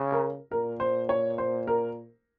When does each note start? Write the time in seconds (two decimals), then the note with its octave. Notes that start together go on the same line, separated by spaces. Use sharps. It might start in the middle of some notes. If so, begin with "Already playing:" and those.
Already playing: C#3
0.12 A#4
0.51 A#2 A#4
0.80 C5
1.09 C#5
1.38 C5
1.67 A#4